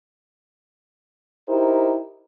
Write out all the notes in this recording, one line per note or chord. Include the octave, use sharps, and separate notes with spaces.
D#4 E4 G4 A#4 C5